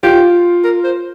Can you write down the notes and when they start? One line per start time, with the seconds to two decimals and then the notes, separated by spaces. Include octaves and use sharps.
0.03 F4 G4
0.64 A#4
0.84 C5